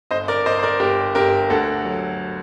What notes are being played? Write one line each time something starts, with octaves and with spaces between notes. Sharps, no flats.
G1 C5 D#5
A#4 D5
G1 C5 D#5
C5
A#4 D5
G1 G4 A#4
G1 G4 A#4
D2 F#4 A4
F#3